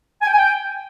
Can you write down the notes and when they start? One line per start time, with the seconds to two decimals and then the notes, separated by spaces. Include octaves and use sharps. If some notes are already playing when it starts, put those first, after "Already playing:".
0.21 G#5
0.27 G5
0.32 G#5
0.38 G5